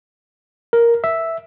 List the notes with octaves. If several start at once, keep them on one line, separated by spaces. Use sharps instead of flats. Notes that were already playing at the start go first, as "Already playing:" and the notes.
A#4
E5